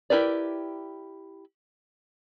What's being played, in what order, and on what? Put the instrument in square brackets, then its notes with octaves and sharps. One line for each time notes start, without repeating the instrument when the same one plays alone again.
[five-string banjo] E4 G4 A#4 B4 D5